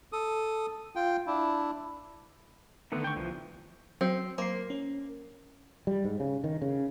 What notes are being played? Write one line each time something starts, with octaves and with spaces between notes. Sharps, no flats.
A4 D#6
F4 G5
D4 E4
D3 D#3 A3 B3
G5 C#6
C2 E3 F3
F#3 C4
A#3 C5 C7
C#4
G3
G#2
C#3
D#3
C#3